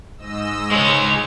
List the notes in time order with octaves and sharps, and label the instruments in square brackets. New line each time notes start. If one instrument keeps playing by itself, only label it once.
[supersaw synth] G#2 D#5 E6
[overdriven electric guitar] G#3 C#5